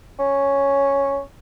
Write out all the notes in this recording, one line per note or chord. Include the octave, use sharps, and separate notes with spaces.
C#4